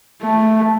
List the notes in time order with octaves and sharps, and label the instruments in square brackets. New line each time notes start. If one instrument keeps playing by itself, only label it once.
[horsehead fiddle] A3